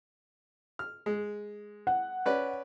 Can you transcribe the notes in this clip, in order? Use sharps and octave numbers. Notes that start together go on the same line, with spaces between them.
F6
G#3
F#5
C#4 B4 D5